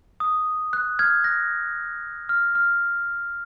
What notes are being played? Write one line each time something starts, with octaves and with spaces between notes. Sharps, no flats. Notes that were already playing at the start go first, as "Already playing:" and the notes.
D#6
F#6
F6 G#6
F#6 A#6
F6 G#6
F6